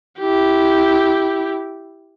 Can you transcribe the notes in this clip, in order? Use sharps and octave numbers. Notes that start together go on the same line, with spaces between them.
E4 G4